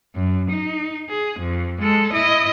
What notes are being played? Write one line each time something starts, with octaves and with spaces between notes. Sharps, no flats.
F#2
D#4
G#4
F2
G#3 A4
E4 D#5